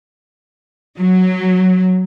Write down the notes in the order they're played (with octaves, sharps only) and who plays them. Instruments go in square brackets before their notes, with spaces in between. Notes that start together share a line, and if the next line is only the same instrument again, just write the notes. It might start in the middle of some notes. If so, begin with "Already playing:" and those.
[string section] F#3